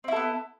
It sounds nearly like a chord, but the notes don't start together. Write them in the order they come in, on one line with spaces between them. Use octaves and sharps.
C4 E4 A4 B3